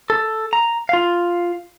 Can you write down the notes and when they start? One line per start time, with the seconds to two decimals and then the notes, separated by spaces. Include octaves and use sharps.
0.10 A4
0.53 A#5
0.89 F4 F5